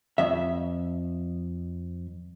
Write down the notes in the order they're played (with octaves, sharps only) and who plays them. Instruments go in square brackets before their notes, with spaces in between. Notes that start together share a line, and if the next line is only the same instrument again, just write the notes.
[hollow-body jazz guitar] F2 E5